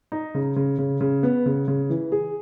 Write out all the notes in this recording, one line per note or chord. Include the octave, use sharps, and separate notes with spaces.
D#4
C#3
C#3
C#3
C#3
B3
C#3
C#3
E3
G#4